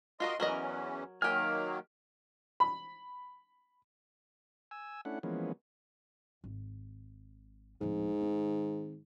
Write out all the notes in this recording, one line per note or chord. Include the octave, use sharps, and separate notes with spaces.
F4 F#4 A#4 D#5 C6
E2 E3 F#3 C#4 A#4 D#5
D#3 F#3 A#3 G4 G#5 F6
B5
G#5 E6
A3 C#4 D4 E4 F#5
E3 F3 G#3 A#3 B3 C#4
G#1
D1 G#2 F3
D#3 C4